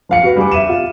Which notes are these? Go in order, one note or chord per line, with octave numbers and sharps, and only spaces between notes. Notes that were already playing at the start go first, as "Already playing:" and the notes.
F3 F5 C#7
F#4 B4
G3 G#4 D6
E5 D#7 E7
F4